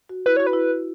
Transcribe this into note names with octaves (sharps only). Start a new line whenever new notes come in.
F#4
E4 B4
F#4 C#5
B4
E4